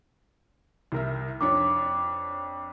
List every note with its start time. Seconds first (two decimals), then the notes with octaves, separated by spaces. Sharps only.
0.92 C2 A#4 E5
1.41 F2 D4 C#5 D6